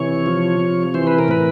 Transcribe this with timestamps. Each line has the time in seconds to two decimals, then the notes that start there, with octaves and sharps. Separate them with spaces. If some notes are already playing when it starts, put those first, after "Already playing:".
Already playing: C3 E3 C#5
0.26 F3
0.60 C3
0.94 E3 C5
1.07 B4
1.19 A#4
1.28 A2 B4